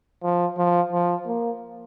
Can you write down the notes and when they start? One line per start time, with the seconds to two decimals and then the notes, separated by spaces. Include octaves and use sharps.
0.23 F3
0.58 F3
0.92 F3
1.27 A#3